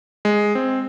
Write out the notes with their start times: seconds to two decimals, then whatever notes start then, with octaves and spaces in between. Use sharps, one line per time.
0.25 G#3
0.55 C4